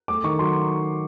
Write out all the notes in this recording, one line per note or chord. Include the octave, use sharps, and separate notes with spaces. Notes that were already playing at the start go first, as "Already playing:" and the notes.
A3 D6
D#3 C#6
F#3 C6